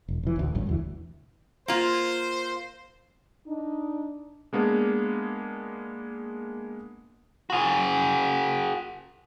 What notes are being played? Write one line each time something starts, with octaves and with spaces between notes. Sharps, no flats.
E1
F1 E3
A1 D2
A1 G2
E1 D2 E3
A#3 F4 C5
D4 D#4
G#3 A#3 B3 D4 G#4
F#4 G#4